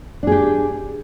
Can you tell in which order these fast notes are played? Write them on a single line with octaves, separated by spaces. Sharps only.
D4 G#4 G4